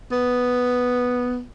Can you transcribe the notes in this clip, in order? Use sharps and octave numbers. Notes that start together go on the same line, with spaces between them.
B3